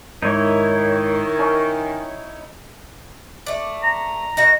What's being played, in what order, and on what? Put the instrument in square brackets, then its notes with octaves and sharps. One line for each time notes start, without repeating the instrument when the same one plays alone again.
[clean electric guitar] G#2 [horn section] D#3 [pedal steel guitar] D#4 E4 C#5 [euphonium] A#4
[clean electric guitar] C#4
[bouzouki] A3 D5
[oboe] A#5
[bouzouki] D#4 F#4 A#4 [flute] A#6